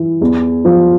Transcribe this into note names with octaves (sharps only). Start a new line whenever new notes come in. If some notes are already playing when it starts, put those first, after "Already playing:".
Already playing: E3
E2
F3